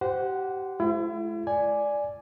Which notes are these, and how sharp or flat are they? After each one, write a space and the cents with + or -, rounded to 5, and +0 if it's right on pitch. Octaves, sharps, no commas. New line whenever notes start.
G4 -25 C5 -15 F#5 +0
G#3 +45 E4 +35
D5 +0 G#5 +0